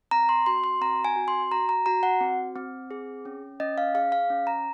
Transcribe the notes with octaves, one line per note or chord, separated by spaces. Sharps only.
C4 A#5
C6
F#4 C6
C6
C4 A#5
G#5
F#4
C6
F#4 A#5
A#5
F#4 A#5
F#5
C4
C4
G#4
C#4
C#4 D#5
F5
G#4 F5
F5
C#4
A#5